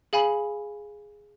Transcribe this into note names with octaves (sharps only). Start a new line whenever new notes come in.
G#4 F5 G#5 B5 F#7